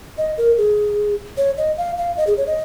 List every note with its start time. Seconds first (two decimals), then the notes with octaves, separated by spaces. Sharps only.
0.18 D#5
0.38 A#4
0.58 G#4
1.37 C#5
1.57 D#5
1.78 F5
1.97 F5
2.17 D#5
2.27 G#4
2.37 C#5
2.47 D#5